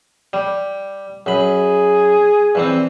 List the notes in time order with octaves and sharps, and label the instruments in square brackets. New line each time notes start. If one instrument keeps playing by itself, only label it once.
[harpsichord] G3
[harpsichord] F#2 B5 [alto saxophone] G#4
[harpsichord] G2 E3 C4